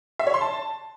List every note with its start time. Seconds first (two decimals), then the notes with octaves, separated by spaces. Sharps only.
0.19 E5
0.27 C#5
0.34 C6
0.41 A5